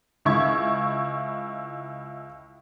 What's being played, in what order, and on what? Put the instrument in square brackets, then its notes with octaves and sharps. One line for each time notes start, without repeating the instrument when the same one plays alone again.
[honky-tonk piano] C#2 E4 C#6 G#6